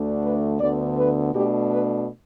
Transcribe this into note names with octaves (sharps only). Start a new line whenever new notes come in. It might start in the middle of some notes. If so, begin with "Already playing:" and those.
Already playing: D2 D3 A3 D4
B4
D2 D3 B3 D5
B4
B2 A3 D4 G4
B4